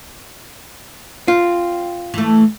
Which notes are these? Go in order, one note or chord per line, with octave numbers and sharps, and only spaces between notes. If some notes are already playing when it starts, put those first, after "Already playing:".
C4 F4
E3 A3